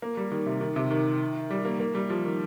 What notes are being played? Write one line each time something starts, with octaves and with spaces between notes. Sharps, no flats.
A#3
G3
D#3
C3
D#3
C3
D#3
G3
A#3
A#3
G3
F3
D#3